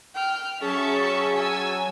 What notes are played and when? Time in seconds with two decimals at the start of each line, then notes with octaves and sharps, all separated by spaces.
0.15 G5 F6
0.62 F#3 C#4 G#4 E5 A5 C#6
1.34 G#5 E6